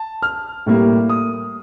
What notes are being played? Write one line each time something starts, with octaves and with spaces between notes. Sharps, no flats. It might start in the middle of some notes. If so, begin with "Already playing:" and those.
Already playing: A5
F6
A2 G3 A#3
D#6